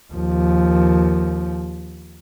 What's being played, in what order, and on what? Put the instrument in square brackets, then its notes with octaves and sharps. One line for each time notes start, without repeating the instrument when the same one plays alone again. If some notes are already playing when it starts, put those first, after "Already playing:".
[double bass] D#2 F3